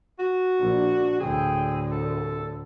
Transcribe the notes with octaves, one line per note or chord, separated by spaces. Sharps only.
F#4
A#1 D4
D2 A2 G#4 G5
C2 A4